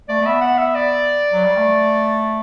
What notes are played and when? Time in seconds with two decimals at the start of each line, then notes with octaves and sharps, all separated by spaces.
0.09 A3 D5
0.21 A3
0.26 B3 E5
0.41 F#5
0.58 E5
0.75 D5
1.32 F#3
1.44 G3
1.56 A3